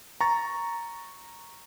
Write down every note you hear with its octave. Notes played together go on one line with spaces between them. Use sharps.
A#5 C#6 A6